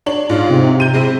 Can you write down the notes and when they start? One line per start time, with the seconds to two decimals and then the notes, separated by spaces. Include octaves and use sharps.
0.06 D4 C#5 F#7
0.29 G#2 F4
0.50 C3
0.80 G6 D#7
0.93 G#3 C4 E4